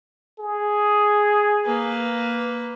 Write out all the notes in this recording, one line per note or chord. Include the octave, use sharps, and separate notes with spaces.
G#4
A#3 B4